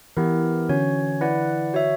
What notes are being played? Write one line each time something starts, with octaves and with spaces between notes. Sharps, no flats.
E3 B3 E4 G4 A#4
D3 C#4 F#4 C#5
E4 B4 D5 F#5
F#4 C#5 E5